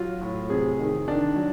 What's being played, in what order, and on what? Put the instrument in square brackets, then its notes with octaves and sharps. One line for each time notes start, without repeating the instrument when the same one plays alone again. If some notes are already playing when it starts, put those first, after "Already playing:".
Already playing: [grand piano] F#3 F4
A2
C3 G#4
D#3
D#3 D4
F#3